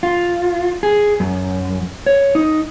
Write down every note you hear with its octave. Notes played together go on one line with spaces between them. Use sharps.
F4
G#4
F#2
C#5
D#4